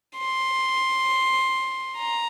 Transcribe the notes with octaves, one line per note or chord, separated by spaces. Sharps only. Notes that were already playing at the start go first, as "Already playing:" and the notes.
C6
A#5